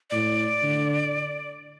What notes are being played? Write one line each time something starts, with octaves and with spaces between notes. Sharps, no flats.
A2 D5
D3